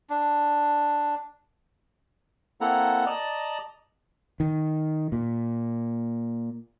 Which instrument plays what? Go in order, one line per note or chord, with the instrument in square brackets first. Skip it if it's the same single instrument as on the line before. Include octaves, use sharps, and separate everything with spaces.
[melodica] D4
[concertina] A#3 C4 E4 A4 F#5 A#5
D5 D#5 A5 A#5
[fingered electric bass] D#3
A#2